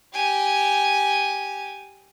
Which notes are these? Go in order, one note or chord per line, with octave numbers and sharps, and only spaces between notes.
G4 G#5